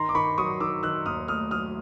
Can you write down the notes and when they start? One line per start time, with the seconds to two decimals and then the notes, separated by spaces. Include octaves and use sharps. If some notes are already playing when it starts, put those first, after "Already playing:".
Already playing: D#3 A#5 C6
0.09 D6
0.15 D#3 B5 C#6
0.38 F#3 C#6 D#6
0.60 D#3 D6 E6
0.83 D#3 E6 F#6
1.06 D#2 D#6 F6
1.28 A3 D#6 F6
1.51 F#3 D#6 F6